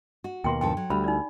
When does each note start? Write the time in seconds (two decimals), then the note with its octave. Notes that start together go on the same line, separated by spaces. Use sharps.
0.24 F#4
0.44 D#2 B2 A#3 G5 C6
0.61 G2 F3 A4 G5
0.77 F#3
0.90 D2 G3 B5
1.04 D#4 D5